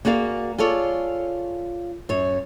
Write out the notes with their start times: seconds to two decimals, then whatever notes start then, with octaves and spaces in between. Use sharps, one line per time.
0.05 A#3 F#4 G#4 D5 F5
0.58 F4 G#4 A4 C#5 D5
2.09 F#2 C#5